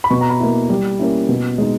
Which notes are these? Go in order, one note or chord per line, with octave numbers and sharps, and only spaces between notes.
B5
B2 C#6
A#5
B5
A#3 E4
G3
A#3 C#4 E4
B2
G#3 D#4